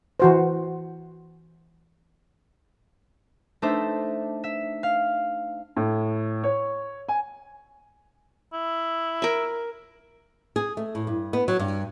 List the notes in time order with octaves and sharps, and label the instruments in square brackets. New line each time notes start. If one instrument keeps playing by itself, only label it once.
[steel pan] E3 F#4 C5
[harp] A3 D4 D#4 A4 C5 E5
E5
F5
[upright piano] A2
C#5
G#5
[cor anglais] E4
[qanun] A#4 E5
[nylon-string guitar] G#4
A3
A2
G2
B3
F#3
G2